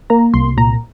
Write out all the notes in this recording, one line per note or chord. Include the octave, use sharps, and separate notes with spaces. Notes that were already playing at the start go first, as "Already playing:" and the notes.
A#3 A#5
C2 C6
A#2 A#5